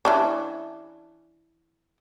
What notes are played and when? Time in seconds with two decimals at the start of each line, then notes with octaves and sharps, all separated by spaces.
0.05 E3 C#4 D4